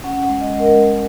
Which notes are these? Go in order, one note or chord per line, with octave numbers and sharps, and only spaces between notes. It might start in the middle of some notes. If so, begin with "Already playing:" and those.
C#4 F#5
F#5
G#3
D#5
G#3
A#4
G#3